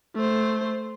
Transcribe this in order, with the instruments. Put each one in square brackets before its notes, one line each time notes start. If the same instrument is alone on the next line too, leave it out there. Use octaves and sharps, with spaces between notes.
[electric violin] A3 C5